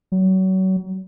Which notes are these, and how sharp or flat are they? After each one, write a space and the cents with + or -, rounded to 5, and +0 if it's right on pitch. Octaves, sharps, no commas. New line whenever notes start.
F#3 +30